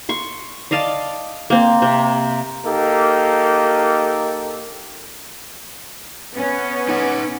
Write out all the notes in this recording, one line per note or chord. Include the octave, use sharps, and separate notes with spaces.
C6 C#6
D5 D#5 F5 A5
A#3 C4
C3
A#3 D#4 G4 A4
B3 C#4
D#4 F#5